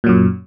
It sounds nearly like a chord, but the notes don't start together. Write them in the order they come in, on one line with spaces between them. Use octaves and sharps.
A#2 F#3 F#2